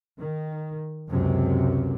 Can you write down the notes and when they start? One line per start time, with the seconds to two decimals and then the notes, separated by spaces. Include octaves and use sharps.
0.17 D#3
1.10 C#2 F#2 C3